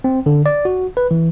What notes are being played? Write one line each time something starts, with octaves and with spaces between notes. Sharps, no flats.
C4
D3
D5
F#4
B4
E3